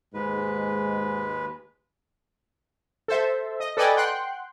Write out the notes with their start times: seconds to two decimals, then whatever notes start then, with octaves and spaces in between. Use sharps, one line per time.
0.14 D#2 G#2 G#3 B4
3.08 A4 C5 E5
3.60 D#5
3.77 A4 B4 D5 D#5 G5 G#5
3.96 F#5 G5 C6 F#6